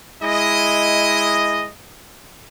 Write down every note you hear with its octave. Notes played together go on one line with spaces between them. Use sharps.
G#3 E4 D#5